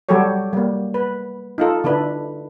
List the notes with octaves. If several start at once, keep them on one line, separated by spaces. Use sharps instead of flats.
F#3 G3 F#4 G4 A4 C#5
G3 A#3
B4
D#4 F4 A4
D3 D4 E4 B4